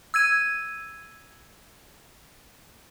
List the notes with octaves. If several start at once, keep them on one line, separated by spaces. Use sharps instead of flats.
E6 G#6 D#7